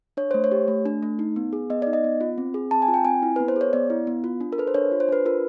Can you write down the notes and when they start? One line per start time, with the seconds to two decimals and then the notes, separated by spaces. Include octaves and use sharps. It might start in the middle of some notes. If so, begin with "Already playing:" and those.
0.17 D4 C#5
0.31 A3 C5
0.44 C#5
0.52 G4
0.68 A3
0.86 D4
1.03 A3
1.19 D#4
1.36 B3
1.53 G#4
1.70 B3 D#5
1.82 D#4 D5
1.93 D#5
2.04 B3
2.21 F4
2.38 C4
2.54 G#4
2.71 C4 A5
2.82 G#5
2.88 F4
2.94 G5
3.05 C4 G#5
3.23 E4
3.36 B3 B4
3.48 C5
3.56 G#4 C#5
3.73 B3 D5
3.90 E4
4.07 B3
4.24 F4
4.41 D4
4.52 A#4
4.58 A4 B4
4.67 C5
4.74 D4 C#5
4.92 F4
5.00 C5
5.09 D4 B4
5.26 F4 A#4